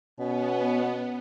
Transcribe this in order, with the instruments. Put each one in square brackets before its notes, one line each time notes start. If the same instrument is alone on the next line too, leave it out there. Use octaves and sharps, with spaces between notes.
[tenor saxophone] B2 [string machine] B3 [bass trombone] C#4